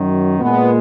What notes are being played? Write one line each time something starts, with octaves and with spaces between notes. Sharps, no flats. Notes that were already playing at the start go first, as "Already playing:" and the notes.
Already playing: F#2 D#3 F#3
A#2 G#3 B3